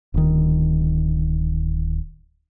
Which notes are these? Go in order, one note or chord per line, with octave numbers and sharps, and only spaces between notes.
D1 D#3